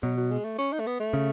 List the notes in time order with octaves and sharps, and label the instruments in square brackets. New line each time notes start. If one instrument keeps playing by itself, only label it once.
[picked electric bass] B2 [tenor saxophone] F#3
[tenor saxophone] F#3
G#3
A3
C#4
D#4
A3
B3
A3
[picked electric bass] C#3